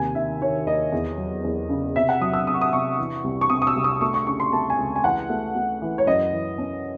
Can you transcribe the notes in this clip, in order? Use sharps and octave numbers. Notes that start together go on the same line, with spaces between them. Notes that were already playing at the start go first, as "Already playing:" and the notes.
Already playing: D#2 C3 G#5
D#3 E5
D#3 C#5
D#2 D#5
E2
F#3
E2
C#3
C3 E5
F#5
F#3 D#6
E6
C3 D#6
C#6
D#6
C3 C#6
E3
C2
C#6
C3 D#6
D#6
E6
C2
D#6
A3 C#6
C#6
C#3 C#6
C6
A3 A5
G#5
C#2
G#5
E3 F#5
A3
A3
E3
C#5
F#2 D#5
E3
C#4